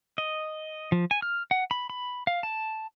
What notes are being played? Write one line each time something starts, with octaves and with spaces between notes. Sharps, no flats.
D#5
F3
G#5
F6
F#5
B5
B5
F5
A5